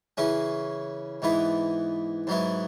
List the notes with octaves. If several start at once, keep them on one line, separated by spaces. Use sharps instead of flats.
C#3 E3 C#4 E4
G#2 E3 B3 E4
G#2 F#3 B3 E4